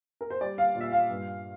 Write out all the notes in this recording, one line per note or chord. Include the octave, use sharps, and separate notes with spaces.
A#4
C5
G3 D5
F5
A#2
E5
F5
G2